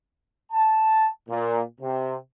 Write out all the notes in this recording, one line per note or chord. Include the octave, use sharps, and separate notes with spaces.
A5
A#2
C3